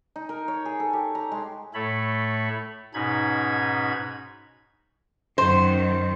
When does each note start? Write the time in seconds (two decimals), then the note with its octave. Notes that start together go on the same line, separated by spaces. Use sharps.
0.16 D#4
0.29 A#4
0.48 C#5
0.65 G#4
0.80 A4
0.93 G4
1.15 A#5
1.31 G#3
1.74 A2 A3 A4 C#5 B5
2.94 G#2 B2 C#4 D#4 B5 G#6
5.38 F#2 D#3 C5